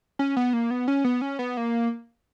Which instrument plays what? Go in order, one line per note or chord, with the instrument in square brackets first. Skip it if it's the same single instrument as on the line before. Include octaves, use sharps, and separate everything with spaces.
[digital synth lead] C#4
B3
A#3
B3
C#4
B3
C#4
B3
A#3